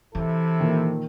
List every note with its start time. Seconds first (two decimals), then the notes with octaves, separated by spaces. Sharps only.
0.15 C3 E3 E4 A4
0.60 A#2 D#3